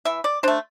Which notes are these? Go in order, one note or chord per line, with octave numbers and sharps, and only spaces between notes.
E3 E5
D5
A3 D4 C5